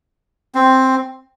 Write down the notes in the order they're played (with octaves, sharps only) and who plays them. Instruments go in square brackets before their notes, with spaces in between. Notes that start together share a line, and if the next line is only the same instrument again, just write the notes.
[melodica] C4